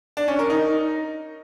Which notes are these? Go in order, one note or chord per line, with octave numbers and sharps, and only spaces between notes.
D4
C#4
A#4
D#4